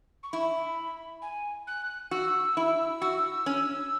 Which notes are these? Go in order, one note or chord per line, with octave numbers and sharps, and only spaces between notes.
C#6
E4 B5
G#5
F#6
F#4 E6
E4
F#4
C#4